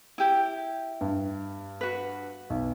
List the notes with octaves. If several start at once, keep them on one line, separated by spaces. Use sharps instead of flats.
E4 G4
G2
F#4 B4
B1